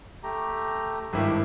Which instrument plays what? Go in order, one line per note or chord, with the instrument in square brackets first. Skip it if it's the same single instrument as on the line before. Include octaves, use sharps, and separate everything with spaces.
[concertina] A3 G4 A#5
[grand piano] G#1 G2 E4 [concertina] A#3 G4 E5